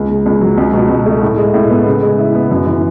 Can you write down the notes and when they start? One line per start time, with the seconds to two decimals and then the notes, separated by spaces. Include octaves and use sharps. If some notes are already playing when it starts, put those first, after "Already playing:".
Already playing: C#2
0.09 C#3
0.26 C#2
0.41 F#3
0.58 C#2
0.74 B2
0.89 C#2
1.06 A3
1.22 A2
1.38 G#3
1.54 A2
1.69 B3
1.86 C#3
2.02 G#3
2.19 E4
2.35 B3
2.51 F#2
2.67 E3